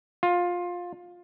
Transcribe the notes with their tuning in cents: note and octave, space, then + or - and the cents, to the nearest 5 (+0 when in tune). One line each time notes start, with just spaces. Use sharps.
F4 +15